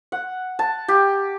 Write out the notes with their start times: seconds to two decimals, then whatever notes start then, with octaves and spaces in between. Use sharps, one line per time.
0.12 F#5
0.59 A5
0.88 G4